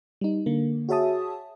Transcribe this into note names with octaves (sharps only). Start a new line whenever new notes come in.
G3 D#4
D3 A#3
F#4 G#4 C#5 E5 A5 D#6